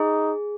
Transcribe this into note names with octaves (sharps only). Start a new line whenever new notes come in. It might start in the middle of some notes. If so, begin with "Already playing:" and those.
Already playing: D#4 G#4